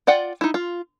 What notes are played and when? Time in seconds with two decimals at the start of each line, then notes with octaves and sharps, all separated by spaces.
0.07 F4 D5 F#5 G5
0.41 D#4 E4
0.54 F4